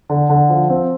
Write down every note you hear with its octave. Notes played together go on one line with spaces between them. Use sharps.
D3
D3
F3
C4